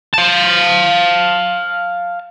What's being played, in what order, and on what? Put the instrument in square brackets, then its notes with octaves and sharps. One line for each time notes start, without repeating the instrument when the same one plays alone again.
[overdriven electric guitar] F5 A5